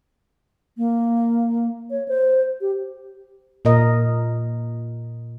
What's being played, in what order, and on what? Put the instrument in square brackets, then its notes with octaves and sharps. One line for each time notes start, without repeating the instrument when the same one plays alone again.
[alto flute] A#3
C#5
C5
G4
[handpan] A#2 A#4 D#5